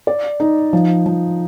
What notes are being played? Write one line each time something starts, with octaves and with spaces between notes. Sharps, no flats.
D5
D#4
F3
F3